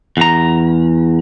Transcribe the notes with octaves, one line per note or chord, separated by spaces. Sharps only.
E2 A#5